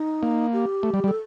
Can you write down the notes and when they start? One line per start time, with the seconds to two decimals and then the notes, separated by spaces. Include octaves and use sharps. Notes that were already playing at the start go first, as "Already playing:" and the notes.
Already playing: D#4
0.23 A#3
0.53 G4
0.83 A3
0.94 G3
1.04 G3
1.08 A4